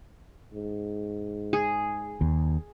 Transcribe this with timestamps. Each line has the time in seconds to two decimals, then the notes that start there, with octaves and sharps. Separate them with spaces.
0.52 G#2
1.53 G#4
2.21 D#2